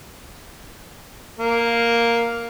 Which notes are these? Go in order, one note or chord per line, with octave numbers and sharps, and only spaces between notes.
A#3